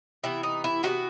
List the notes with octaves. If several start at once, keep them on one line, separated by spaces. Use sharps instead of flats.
C3 E3 B3 E4
D#4
E4
C3 E3 B3 D#4 F#4